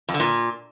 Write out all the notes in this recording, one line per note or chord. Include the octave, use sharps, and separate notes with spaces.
F2
D3
A#2